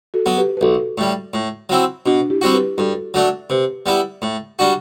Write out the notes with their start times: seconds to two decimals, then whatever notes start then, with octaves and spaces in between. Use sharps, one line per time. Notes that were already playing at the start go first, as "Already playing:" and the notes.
0.14 F#4 A4
0.26 F#3 B3
0.37 G4 B4
0.57 B4
0.61 B1 F#4 A4
0.98 A2 G3
1.34 A2
1.69 F#3 C4 E4
2.06 B2 D4 F#4
2.30 E4 G4
2.41 G3 C4 F#4
2.54 G4 B4
2.78 G2 F#4 A4
3.14 F#3 A3 D4
3.50 C3 G4 B4
3.86 G3 B3 E4
4.22 A2
4.59 G3 D4 F#4